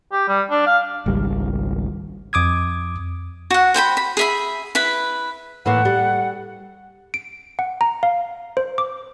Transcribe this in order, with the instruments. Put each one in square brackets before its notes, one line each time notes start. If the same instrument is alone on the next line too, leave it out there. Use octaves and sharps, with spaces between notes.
[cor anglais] G4
G3
D4
F5
[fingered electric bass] G#1 C#2 G3
[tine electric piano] F2 D6 D#6 G#6
[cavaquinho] F#4 F#5
C5 G5 G#5 B5
B5
G#4 E5 B5
E4 B4 B5
[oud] A2 E3 A#3 [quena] F#5
[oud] G3
[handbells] D7
F#5
A#5
F5
C5
D6